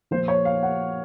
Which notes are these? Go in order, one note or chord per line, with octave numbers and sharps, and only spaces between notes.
A#2 F3 C5
C#5
F5
F#5